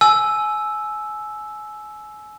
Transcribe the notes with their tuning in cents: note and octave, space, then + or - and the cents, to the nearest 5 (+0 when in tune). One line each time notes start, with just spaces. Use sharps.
G#5 +30 E6 +0